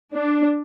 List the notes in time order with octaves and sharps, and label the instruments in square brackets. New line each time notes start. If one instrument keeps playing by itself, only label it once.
[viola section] D4